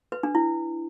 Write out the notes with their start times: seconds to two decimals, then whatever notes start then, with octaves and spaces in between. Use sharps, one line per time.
0.12 B4
0.23 D4
0.35 E4